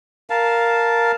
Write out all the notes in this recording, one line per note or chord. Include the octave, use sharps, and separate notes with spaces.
A#4 F5 A5